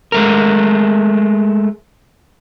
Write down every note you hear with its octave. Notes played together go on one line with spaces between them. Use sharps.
G#3 A3 A#4